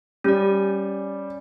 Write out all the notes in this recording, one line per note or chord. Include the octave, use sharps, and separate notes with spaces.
G3 C#4 D5